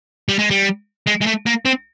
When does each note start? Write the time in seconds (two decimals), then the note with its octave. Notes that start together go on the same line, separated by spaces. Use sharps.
0.29 G3
0.39 G#3
0.50 G3
1.07 G#3
1.22 G#3
1.27 A3
1.47 A#3
1.66 C4